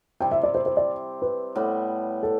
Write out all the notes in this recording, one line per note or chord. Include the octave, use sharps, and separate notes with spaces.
C3 G3 C4 E4 G5
E5
D5
C5
C5
D5
B4
A2 G3 B3
A4